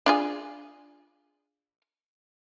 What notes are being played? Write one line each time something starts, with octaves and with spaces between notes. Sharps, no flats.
D4 F4 G#4